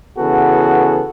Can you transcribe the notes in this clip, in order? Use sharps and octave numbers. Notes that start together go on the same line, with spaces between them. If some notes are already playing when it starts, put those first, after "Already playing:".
C#3 E3 B3 F#4 G#4 A4